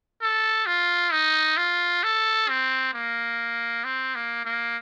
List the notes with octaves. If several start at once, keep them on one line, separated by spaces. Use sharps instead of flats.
A4
F4
D#4
F4
A4
C4
A#3
C4
A#3
A#3